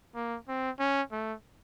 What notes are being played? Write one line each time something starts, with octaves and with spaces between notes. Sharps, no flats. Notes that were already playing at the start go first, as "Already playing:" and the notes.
A#3
C4
C#4
A3